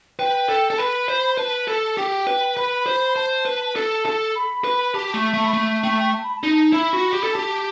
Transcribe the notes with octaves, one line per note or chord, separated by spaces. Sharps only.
B4 G5
A4
A4 A5
B4 B5
C5
B4 A5
A4
G4 G5
B4
B4 B5
B5
C5
B5
C5 A5
B4
A4 A5
A4
B5
B4
B5
G4 A5
A3
A3
B5
A3 A5
A3 G5
A5
G5
A5
B5
A5
D#4
E4 B5
F#4
G4
A4
G4 A5